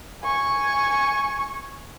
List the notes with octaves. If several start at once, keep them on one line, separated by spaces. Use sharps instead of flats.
G#5 C#6